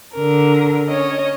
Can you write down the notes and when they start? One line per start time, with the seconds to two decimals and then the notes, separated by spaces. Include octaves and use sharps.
0.15 D3 A#4
0.88 C#4 C#5 D#5